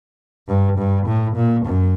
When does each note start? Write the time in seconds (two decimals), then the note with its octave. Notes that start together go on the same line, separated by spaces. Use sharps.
0.48 G2
0.78 G2
1.07 A2
1.36 A#2
1.66 F#2